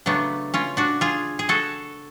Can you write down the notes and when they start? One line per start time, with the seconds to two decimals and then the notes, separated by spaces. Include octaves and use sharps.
0.06 C#3 F#3 A3 B3 D4
0.54 C#4 F4
0.77 D4 F#4
1.01 F4 G#4
1.39 G#4
1.49 F#4 A4